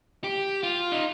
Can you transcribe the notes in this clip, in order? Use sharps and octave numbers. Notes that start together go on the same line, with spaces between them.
G4
F4
D#4